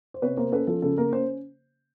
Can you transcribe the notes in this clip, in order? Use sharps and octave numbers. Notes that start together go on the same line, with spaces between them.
C5
C3 B4 C#5
A#3 A#4 C5
C#4 A4 B4
F3 A4
C#3 A4
A#3 A#4
C#4 C5